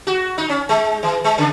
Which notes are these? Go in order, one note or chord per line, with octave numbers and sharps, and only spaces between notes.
F#4
D#4
C#4
G#3
E3
G#3
C#3